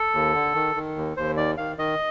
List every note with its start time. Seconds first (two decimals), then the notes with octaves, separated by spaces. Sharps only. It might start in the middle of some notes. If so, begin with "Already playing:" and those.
Already playing: A4
0.14 D#2
0.34 D3
0.55 D#3
0.75 D#3
0.96 D#2
1.17 D#2 C5
1.37 D#3 D5
1.58 D#3 F5
1.78 D#3 D#5